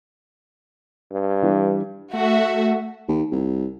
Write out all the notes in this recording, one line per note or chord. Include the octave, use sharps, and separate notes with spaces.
G2
E3 G3 D4
A3 F#4 E5
D#2
C2